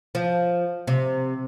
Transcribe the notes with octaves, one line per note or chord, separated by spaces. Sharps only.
F3
C3